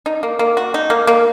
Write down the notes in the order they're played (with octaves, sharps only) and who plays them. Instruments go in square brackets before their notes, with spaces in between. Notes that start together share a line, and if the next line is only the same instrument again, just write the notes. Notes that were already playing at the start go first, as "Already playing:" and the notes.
[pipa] D#4
A#3
A#3
F#4
D#4
A#3
A#3